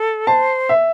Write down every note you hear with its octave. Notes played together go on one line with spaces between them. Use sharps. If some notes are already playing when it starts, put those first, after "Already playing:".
Already playing: A4
C5 A5
E5